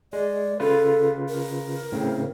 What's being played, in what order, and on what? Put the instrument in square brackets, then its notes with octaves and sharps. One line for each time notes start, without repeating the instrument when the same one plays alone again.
[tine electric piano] G#3 [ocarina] D5
[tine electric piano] C#3 F4 B4 [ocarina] A4
[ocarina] A#4
[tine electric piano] A2 C#3 C4